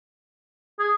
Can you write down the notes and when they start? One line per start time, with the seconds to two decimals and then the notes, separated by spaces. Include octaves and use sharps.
0.79 G#4